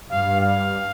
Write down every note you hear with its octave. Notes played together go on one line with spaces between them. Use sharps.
G2 F5
F5